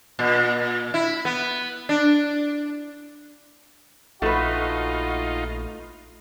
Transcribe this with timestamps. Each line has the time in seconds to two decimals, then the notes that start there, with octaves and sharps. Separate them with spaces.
0.19 A#2
0.94 E4
1.25 B3
1.89 D4
4.22 A#1 A3 D#4 F4 F#4 B4